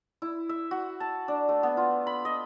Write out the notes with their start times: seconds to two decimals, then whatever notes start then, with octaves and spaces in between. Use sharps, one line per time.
0.22 E4
0.49 E5
0.71 F#4
1.00 A5
1.28 D4
1.49 A3
1.63 B3
1.77 F4
2.07 B5
2.25 D#5